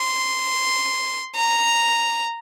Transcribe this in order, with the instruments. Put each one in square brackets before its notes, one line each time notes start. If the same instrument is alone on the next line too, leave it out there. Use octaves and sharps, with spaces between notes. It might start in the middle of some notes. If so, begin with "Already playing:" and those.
Already playing: [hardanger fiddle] C6
A#5